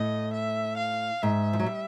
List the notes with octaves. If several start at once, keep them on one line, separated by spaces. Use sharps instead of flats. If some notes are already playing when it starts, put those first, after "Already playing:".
Already playing: A2 A3 D#5
E5
F5
G#2 G#3 E5
F3
F#3
G3